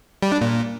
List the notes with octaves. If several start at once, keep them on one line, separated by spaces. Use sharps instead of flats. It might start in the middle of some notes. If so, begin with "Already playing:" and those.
G3
D4
A#2